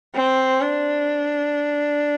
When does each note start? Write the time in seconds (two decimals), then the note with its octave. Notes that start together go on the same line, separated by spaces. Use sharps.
0.15 C4
0.61 D4